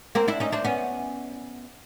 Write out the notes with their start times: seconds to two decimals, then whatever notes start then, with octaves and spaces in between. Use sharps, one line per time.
0.15 A#3 C4
0.28 D4 E4
0.40 C#4 D#4
0.52 C4 D4
0.65 B3 C#4